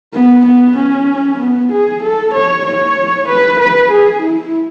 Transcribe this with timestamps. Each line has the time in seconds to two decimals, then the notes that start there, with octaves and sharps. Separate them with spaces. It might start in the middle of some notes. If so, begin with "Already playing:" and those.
0.14 B3
0.45 B3
0.76 C#4
1.39 B3
1.72 G#4
2.03 A4
2.34 C#5
2.66 C#5
3.28 B4
3.60 B4
3.91 G#4
4.23 E4